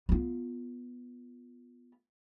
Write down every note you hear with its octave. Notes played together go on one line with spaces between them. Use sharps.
B3 F4